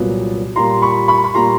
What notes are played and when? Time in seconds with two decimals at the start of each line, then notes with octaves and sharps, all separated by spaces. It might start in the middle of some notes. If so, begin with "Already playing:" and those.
Already playing: C2 A#2 F#3 B3
0.56 A#2 G3 A#3 A#5 C6
0.82 B5 C#6
1.08 B5 C#6
1.24 B5
1.34 A#2 G3 A#3 A#5 C6